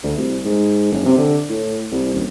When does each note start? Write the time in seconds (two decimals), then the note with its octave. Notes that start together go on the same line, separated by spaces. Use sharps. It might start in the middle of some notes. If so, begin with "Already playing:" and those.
0.03 D2
0.17 C2
0.45 G#2
0.92 F#1
1.06 C3
1.17 D3
1.49 A2
1.92 C2
2.14 D#1